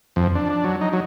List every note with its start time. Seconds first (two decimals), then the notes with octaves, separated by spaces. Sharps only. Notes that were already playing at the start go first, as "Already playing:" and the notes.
0.16 F2
0.35 D4
0.49 D4
0.64 F#3
0.81 D#4
0.93 F#3